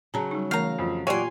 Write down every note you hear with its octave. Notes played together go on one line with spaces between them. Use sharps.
C#3 F#3 A5 A#5
G3 D#4
E3 A3 A#4 F5 A#5
F2
A#2 F#3 G4 C#5 D5 G5 G#5 C6